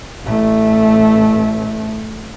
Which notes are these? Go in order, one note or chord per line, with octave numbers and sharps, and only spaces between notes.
A1 A3